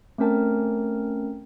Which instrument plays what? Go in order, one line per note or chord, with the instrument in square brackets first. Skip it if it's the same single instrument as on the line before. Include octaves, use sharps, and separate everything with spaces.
[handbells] A3 C4 C#4 A#4 G5 A5